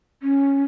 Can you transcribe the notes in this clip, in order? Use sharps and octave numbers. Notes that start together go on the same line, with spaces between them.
C#4